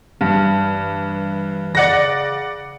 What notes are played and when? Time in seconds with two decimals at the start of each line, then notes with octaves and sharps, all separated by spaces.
0.21 G2 E3
1.75 C#3 D5 F#5 A#6